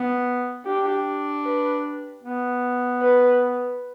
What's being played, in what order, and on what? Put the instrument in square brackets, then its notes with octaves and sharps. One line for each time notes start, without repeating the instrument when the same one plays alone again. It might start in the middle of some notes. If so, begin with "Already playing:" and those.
Already playing: [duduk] B3
[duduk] D4 [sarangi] G4
[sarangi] B4
[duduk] B3
[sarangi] B4